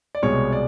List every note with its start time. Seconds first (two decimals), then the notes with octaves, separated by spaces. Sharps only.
0.15 D5
0.23 C2 B2 G#3 C#5
0.52 D5